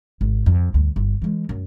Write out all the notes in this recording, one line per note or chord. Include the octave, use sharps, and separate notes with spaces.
G#1
F2
D2 G2
G1
E3 G#3
F#2